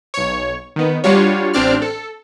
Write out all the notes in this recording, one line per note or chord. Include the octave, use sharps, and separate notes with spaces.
B1 C#5
D#3 B3
G3 D4 F4 F#4 C#5
A1 C4 D4 D5 F6
A4